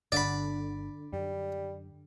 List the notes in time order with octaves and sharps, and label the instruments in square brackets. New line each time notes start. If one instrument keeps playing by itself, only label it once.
[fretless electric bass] G1 G2 [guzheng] D3 [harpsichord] D5 B5
[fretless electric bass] F#2 [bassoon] G3